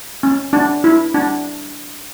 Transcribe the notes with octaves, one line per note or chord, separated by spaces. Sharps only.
C#4
D4
E4
D4